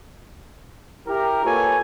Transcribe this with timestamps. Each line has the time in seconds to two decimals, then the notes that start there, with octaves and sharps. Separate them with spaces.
1.08 E4 G4 A#4
1.45 A#3 F4 A4 B4 C#5 G#5